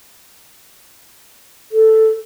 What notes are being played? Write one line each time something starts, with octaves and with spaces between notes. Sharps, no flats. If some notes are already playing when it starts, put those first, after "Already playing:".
A4